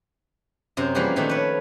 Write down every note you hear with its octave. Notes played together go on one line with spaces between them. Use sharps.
F#2 C3 C5 A#5
E3 F3 G3 A#3 F#4 G#4
A#2 D#3 F3 A3 C4 D4
B4 C#5